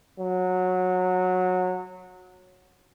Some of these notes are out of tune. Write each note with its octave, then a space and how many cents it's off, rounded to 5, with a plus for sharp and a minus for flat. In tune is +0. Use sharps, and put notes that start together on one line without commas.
F#3 -15